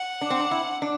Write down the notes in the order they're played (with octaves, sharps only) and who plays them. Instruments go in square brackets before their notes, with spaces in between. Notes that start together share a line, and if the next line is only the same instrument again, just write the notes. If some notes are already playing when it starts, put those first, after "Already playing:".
Already playing: [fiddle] F#5
[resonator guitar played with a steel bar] D4
C4
D4
E4
D4